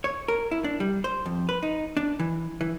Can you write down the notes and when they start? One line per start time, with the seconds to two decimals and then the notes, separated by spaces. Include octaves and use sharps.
0.04 C#5
0.28 A#4
0.51 E4
0.64 D4
0.80 G3
1.04 C5
1.26 F2
1.49 B4
1.63 D#4
1.97 D4
2.19 E3
2.61 E3